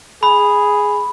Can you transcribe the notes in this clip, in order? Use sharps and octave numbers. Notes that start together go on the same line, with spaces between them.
G#4 B5